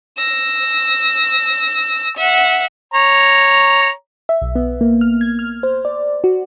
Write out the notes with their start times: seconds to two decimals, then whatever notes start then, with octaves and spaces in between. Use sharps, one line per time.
0.18 E6 A#6
2.17 E5 F#5
2.94 C#5 A#5
4.29 E5
4.42 B1
4.56 B3
4.81 A#3
5.01 F6
5.21 G#6
5.39 F6
5.63 C5
5.85 D5
6.24 F#4